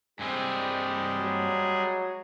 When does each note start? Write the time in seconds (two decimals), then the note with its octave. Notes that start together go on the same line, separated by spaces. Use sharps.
0.19 G2 G3 G#3 C4 G#4
1.18 F#3